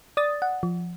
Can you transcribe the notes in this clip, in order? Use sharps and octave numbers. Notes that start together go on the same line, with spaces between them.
D5 D#6 A6
F#5
F3